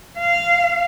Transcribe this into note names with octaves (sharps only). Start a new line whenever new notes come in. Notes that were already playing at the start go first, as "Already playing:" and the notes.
F5